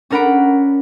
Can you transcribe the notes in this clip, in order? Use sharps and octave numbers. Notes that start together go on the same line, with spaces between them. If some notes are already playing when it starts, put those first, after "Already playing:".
C#4 D4 A#4 F#5 B5 D7